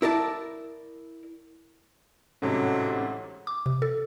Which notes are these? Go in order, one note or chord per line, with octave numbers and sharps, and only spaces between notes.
E4 A#4 D5 A5
A1 G#2 C3 F#3 C#4 A4 F#5
D6
C3
A4